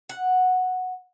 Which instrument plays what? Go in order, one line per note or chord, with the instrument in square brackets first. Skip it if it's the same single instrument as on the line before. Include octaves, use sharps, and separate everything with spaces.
[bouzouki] F#5